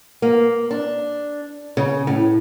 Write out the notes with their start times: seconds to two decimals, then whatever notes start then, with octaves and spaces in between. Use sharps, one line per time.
0.22 A#3
0.71 D4
1.77 C#3
2.07 A2